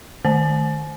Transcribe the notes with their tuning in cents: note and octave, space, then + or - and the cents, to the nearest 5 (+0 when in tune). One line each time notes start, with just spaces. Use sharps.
D#3 -30 C5 +0 G#5 +45